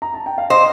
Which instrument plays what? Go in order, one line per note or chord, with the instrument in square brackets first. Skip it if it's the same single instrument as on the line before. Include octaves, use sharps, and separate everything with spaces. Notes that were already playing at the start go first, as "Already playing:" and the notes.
[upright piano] A#5
A5
G5
F5
[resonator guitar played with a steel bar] C5 [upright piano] D#5